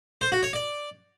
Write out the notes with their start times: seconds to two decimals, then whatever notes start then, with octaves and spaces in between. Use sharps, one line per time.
0.21 C5
0.32 F#4
0.43 C#5
0.53 D5